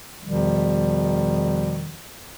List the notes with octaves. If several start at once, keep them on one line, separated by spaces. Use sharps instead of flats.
E2 B2 D#3 F3 G3